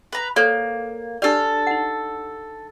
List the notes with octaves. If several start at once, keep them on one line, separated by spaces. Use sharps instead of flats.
B4 A#5
A#3 A4 C5 C#5
D4 G4 A4 D5 F6
D#4 F#5